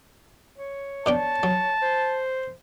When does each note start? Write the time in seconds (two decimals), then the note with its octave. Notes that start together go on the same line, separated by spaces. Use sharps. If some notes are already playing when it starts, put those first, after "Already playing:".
0.58 C#5
1.06 B2 D4 G5 A5
1.43 F#3
1.82 C5